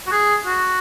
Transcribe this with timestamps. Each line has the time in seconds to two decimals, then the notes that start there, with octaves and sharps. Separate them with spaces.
0.07 F#4
0.12 G#4
0.46 F#4